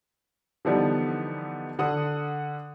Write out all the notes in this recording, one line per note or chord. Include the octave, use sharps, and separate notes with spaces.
D3 E3 F3 G3 B3 D#4
D3 F#5 D#6